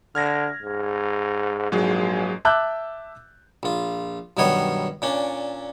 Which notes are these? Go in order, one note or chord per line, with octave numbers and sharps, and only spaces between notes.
D3 F6 G#6 A#6
G#2
A#1 G#2 F#3 G#3
E5 A5 D6 E6 F#6 G6
A#1 F4
B1 G2 D#3 B3 C#5 D#5
A#2 C#4 D4